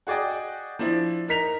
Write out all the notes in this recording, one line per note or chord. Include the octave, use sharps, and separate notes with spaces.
F#4 G#4 D5 D#5 G5
F3 D4 E4
D#4 A#4 B6 F7